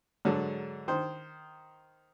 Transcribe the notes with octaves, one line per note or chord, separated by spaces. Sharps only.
G#2 D3 F#3 G#3
D#3 C5